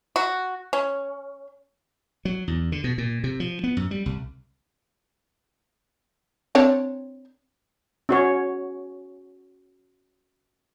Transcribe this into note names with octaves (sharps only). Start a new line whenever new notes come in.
F#4
C#4
F#3
E2
D3
B2
A#2
C3
F3
B3
F#2
G3
C2
C4 D4 C#5
C#4 F#4 C#5